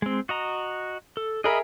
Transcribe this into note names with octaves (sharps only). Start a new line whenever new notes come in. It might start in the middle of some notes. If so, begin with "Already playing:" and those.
G#3 C4
F#4 D#5 A#5
A4
G#4 A#4 D#5 E5 B5